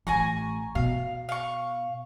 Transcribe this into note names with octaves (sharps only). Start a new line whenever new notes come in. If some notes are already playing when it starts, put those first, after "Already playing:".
A1 G#5 A#5 C#6
B2 F5
F5 C#6